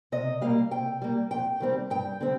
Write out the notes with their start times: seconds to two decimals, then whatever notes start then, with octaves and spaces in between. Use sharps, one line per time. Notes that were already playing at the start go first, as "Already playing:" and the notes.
0.12 C3 D#5
0.41 G3 A#3 F5
0.71 C3 G5
1.02 G3 A#3
1.31 F2 G5
1.60 D#3 G3 C4
1.90 G2 G5
2.21 D3 G3 C4